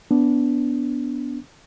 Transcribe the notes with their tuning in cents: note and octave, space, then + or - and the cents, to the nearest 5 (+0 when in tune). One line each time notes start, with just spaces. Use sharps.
B3 +0 D4 -20